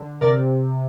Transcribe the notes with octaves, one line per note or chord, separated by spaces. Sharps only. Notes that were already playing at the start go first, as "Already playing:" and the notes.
Already playing: D3
C3 A#4 D5